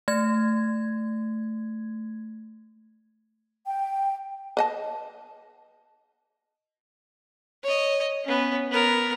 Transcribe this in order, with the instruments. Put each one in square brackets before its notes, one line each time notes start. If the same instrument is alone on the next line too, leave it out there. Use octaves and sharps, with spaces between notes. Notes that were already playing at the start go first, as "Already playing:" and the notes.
[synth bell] A3 G#6
[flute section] G5
[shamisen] B4 D#5 A5
[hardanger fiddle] C#5 D#5
B3 C#4
B3 A#4